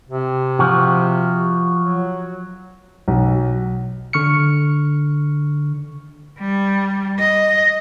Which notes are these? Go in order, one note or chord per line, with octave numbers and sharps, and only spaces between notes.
C3
F3 F#4
F#3
B1
D3 C#6 F6 C#7
G3
D#5